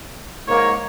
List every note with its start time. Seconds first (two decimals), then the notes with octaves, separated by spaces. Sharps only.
0.48 G#2 A#3 C#5